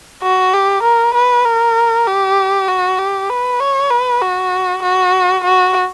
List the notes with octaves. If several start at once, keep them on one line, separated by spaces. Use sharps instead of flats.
F#4
G4
A#4
B4
A#4
G4
F#4
G4
B4
C#5
B4
F#4
F#4
F#4